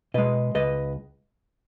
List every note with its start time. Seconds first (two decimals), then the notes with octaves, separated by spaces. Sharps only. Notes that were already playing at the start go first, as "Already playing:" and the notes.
0.14 B2 G#3 B4 D#5
0.55 C#2 B4 D#5